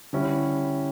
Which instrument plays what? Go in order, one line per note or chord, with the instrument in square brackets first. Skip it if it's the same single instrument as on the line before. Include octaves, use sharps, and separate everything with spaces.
[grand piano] D3 G3 C#4 E4